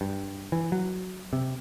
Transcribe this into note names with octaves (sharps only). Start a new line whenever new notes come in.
G2
E3
F#3
C3